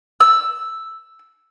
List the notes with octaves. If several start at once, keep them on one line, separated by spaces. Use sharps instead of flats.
E6